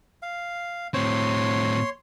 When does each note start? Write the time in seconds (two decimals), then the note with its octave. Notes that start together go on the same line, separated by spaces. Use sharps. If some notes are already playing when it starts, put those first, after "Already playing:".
0.22 F5
0.94 A2 C4 C#5 C6